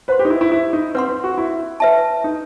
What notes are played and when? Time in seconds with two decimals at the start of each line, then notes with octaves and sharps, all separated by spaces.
0.08 B4 C5 F#5 C6
0.19 G4
0.25 D#4
0.30 E4
0.41 E4
0.52 E4
0.73 D#4
0.95 C4 B4 F#5 C6
1.08 C4
1.24 F#4
1.38 E4
1.80 B4 E5 A5
2.24 D#4